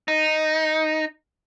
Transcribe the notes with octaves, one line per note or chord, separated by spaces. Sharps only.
D#4